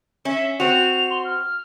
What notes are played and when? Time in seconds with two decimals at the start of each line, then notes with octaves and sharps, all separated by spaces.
0.25 C#4 E5
0.60 C4 F#4 F7
1.10 C6
1.25 F6